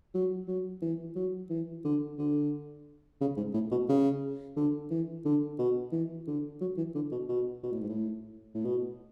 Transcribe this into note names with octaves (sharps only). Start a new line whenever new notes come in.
F#3
F#3
E3
F#3
E3
D3
D3
C#3
G#2
A2
B2
C#3
D3
E3
D3
B2
E3
D3
F#3
E3
D3
B2
B2
B2
A2
G#2
A2
A2
B2